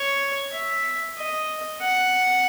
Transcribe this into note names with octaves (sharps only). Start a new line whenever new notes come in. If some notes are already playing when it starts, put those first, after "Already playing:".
Already playing: C#5
E5
D#5
F#5